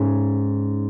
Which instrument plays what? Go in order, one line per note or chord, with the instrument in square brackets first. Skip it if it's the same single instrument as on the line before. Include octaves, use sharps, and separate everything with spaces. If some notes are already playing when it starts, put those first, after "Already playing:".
Already playing: [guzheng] G#2 C#4